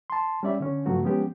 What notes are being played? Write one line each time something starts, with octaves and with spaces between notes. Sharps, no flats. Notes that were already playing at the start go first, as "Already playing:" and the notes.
A5 C6
G3 C#4 D5 E5
D3 C#4
G2 C#3 F3 F#3 A3 F#4
F3 G#3 B3 C#4 G4